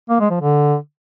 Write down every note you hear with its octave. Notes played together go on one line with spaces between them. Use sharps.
A#3
G#3
F3
D3